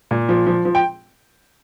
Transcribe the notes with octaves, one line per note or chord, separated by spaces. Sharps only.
A#2
F3
F3
F3
G5